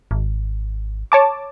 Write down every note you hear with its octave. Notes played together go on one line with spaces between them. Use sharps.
G#1
C#5 A5 D6